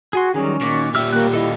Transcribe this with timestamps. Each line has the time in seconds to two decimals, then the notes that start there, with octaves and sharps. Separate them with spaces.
0.13 F#4 G#4 G#5 C6
0.34 D#3 F#3 G3 C#4 G#4
0.61 A#2 D#3 F#4 D6
0.95 A#2 G3 G4 E5 E6 F6
1.13 A#3 F#4 F#6
1.33 E4 A4 D#5 F5